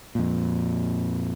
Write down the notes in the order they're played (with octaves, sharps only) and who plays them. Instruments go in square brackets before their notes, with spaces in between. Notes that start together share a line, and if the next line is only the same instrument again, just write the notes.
[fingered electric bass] F2 A#2